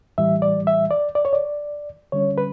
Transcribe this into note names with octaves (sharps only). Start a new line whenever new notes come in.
A2 E3 G3 E5
D5
E5
D5
D5
C#5
D5
D3 G3 C#4 C#5
B4